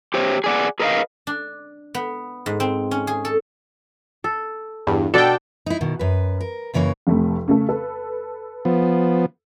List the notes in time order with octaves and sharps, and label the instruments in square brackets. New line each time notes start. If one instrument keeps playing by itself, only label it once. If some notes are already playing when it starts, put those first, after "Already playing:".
[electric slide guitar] G4 C5 C#5
G#4 D5 F#5
G#4 A#4 B4 D5 D#5 F5
[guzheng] D4
B3
G#2
C4
C#4
G#4
A4
[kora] A4
[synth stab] E2 G2
[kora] B2 D4 D5 [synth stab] A4 G5
[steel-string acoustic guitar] D#4 E4
B2 D#3
F#2 B4
A#4
F#2 C#3 E3 A#3 C#5
[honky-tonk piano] F1 F2 A3
C#3 A3 A4
A4 B4
[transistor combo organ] F3 B3